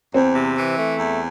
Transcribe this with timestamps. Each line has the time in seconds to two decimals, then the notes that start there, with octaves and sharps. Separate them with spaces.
0.14 E2 C4
0.34 C3
0.55 E3
0.76 A3
0.97 E2